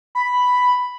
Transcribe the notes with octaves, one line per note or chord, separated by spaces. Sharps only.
B5